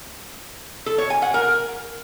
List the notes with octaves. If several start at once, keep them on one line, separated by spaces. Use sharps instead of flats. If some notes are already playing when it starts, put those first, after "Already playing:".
A4
C#5
G#5
F#5
A#4